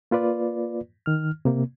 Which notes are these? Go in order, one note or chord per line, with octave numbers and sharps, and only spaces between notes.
A#3 F4 B4 D5
D#3 F6
C3 A#3